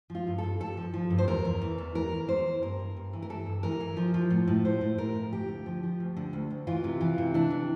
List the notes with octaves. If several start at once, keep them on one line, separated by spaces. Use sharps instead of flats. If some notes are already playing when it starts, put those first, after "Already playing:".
F3
F4
G2
A4
G2
G2 A4
F3
F3
G2
C5
E2 A#4
E2
E3
E2
E3 A#4
E3
E2 C5
E2
G2 A#4
G2
G2
E3
A#4
E3 A4
G2
E3 A#4
E3
F3
F3
A2
A2
A2 C5
A2
A2 A#4
F3
D2 G4
D3
F3
F3
D2
D3
D2
D2
E3 F4
C3
E3
C3
E3 D4
C3